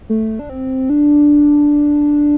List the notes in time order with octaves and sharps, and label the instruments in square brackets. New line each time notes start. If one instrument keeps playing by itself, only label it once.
[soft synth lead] A3
D4
C4
D4